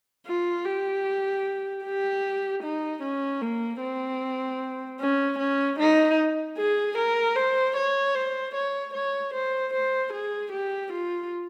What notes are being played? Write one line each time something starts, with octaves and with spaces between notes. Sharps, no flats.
F4
G4
G4
D#4
C#4
A#3
C4
C#4
C#4
D#4
G#4
A#4
C5
C#5
C5
C#5
C#5
C5
C5
G#4
G4
F4